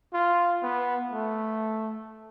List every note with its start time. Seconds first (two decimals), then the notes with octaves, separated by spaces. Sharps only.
0.14 F4
0.62 B3
1.12 A3